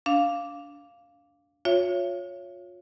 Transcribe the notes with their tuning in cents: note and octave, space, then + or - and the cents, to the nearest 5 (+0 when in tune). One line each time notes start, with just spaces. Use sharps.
D4 -25 F5 +0
F4 +35 C#5 +0 E5 +40